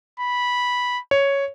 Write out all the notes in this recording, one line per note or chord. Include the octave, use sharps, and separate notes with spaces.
B5
C#5